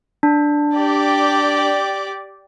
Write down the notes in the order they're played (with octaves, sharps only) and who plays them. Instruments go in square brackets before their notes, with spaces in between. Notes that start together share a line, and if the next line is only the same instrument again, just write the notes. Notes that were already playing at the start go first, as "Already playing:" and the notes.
[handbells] D4
[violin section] G4 D5